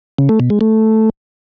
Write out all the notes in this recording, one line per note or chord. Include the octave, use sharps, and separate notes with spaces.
C#3
A3
B2
G#3
A3